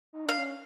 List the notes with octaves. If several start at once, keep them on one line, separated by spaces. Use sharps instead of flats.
D#4
D4 F5
C#4